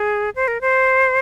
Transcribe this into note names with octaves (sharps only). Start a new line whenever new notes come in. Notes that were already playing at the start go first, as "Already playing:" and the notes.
Already playing: G#4
C5
A#4
C5